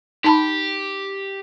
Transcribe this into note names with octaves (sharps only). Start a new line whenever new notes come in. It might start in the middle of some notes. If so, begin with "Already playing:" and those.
D#4 G4 A5 B5